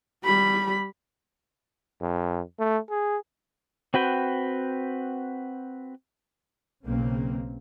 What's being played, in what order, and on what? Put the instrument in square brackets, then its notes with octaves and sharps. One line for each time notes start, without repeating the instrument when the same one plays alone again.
[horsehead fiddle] G3 B5
[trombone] F2
A3
G#4
[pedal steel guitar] C4 F#4 B4 G5
[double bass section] B1 C#3 A#3 C4